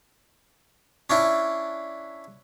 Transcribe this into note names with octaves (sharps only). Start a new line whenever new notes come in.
C#4 D4 E4